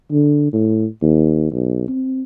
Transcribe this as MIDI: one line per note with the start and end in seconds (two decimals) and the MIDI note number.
0.12 0.51 50
0.53 0.86 45
1.02 1.52 39
1.52 1.85 35
1.88 2.23 60